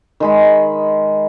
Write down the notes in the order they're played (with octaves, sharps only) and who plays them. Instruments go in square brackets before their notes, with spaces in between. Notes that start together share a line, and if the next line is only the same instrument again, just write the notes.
[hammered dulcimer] D#3 G#3 B5